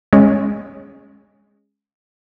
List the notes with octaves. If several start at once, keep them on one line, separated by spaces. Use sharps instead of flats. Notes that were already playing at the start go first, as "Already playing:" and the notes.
G#3 C#4